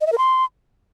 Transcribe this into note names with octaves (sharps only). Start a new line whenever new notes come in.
D#5
E5
A#4
C6